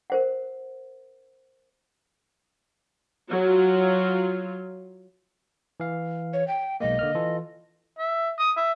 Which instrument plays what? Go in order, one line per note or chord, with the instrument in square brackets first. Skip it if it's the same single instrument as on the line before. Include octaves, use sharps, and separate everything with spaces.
[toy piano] A#4 C5 F#5
[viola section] F#3 F4
[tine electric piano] E3 F5
[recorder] C#5
G5
[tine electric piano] B1 G#3 A#3 [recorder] D#5
[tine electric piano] D3 A#3 F6
E3 F4 A4
[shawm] E5
D#6
E5